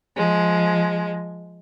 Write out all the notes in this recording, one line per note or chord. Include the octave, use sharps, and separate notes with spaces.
F3 G#3